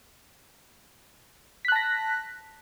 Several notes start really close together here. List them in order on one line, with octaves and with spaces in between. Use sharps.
B6 F#6 A5 A#6